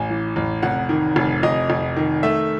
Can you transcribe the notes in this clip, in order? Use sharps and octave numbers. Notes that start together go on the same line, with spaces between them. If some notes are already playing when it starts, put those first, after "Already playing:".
Already playing: A1 G#5
E3
A1
F1 F#5
D#3
F1
F1 D#5
F1
D#3
A3 E5